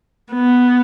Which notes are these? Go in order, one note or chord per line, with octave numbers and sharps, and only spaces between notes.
B3